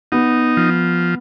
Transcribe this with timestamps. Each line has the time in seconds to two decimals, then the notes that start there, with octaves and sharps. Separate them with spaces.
0.12 B3 D#4
0.57 F3